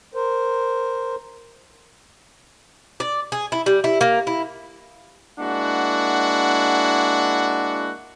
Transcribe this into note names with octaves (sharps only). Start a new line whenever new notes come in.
A#4 C5
D5
G#4
E4
G3
E4
A#3
E4
G#3 A#3 D4 E4 F#4 F#5